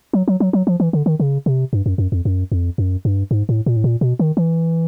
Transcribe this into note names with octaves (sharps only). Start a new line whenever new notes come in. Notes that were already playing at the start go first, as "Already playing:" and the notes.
F#3
F#3
F#3
F#3
F3
E3
D3
D#3
C#3
C3
G2
F#2
F#2
F2
F#2
F2
F#2
G2
G#2
A2
A#2
A2
A#2
B2
D#3
E3